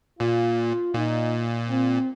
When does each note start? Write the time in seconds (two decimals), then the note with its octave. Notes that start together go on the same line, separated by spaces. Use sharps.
0.20 A#2 F4
0.94 A#2 D#4
1.69 C4